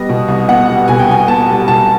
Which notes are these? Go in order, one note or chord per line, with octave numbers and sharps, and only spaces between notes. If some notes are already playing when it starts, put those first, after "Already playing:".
Already playing: G3 B3 D#5
B2
C2
B3 F#5
G3
B2 G#5
G5
C2 G#5
B3 A5
G3
B2 A5